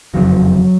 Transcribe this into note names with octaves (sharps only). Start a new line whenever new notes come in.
F#1 F2 D3 F#3